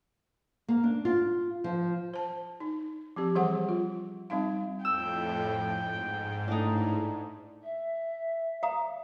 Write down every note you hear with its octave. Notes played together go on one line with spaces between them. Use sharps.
A#3
D4
F4
F3
C5 A5
D#4
F3 C4 G4
E3 G3 G#4 C5 F#5
F4
G3 C4 D#4 F5
F2 A2 G5 E6
G#2
A2 D4 D#4
E5
F5 A#5 D#6